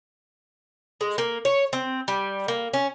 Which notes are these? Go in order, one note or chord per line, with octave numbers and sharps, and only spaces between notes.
G#3
A#3
C#5
C4
G3
A#3
C#4